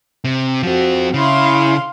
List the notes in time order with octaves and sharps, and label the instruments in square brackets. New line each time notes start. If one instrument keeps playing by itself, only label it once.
[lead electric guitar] C3
[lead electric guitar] F3 C4 [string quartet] F#4
[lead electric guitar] C#3 [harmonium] E4 [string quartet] F5 C6